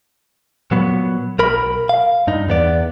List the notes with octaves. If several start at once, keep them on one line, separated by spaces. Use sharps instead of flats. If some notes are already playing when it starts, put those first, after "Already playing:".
A#2 F#3 B3
B1 A#4 B5
F5
G2 D#4
E2 B3 D5